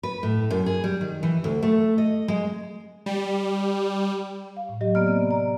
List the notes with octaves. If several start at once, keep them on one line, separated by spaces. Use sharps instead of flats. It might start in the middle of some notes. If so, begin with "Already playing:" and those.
B4
A2
F#2
G#4
G3
D#3
E3
D2
A3
D#5
G#3
G3
F5
A2
F#3 G4 D#5
A#3 B3 D5 F6
C3 C4
D5 A#5